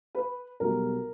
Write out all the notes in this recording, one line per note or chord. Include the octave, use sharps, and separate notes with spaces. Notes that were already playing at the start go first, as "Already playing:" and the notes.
B4
B1 B2 G3 A#4